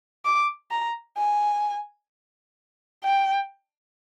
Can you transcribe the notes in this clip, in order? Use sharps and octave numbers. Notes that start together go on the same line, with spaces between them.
D6
A#5
G#5
G5